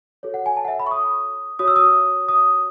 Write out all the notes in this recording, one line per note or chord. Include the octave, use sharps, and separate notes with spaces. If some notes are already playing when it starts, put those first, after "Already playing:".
F#4 A4 C#5
F#5
G#5
A5
F#5
E5
B5
C#6
D#6
F#4 C#5 D#6
E6
D#6
D#6